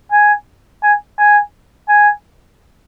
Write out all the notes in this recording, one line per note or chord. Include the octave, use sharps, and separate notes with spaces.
G#5
G#5
G#5
G#5